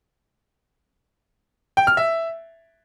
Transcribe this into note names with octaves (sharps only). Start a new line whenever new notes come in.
G5
F6
E5